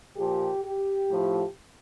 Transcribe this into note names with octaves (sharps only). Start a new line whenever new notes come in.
A#2 F3 G4
G4
A2 F3